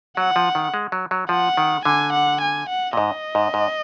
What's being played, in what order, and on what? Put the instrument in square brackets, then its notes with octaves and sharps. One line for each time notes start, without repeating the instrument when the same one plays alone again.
[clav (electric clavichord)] F#3 [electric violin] F#5
[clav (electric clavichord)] F3
D#3
G#3
F#3
F#3
[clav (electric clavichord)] F3 [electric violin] F#5
[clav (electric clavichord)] D#3
[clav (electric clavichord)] D3 [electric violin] G#5
[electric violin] F#5
G#5
F#5
[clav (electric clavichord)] A#2
[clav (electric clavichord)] G#2 [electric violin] D#5
[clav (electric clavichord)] G#2
G#2